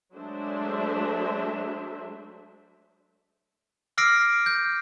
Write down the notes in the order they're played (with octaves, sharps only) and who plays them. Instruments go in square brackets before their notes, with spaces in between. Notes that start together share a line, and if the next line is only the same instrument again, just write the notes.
[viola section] F#3 G#3 A3 D4 C5 E5
[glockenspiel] D6 E6 F6 A#6 C7 D7
G6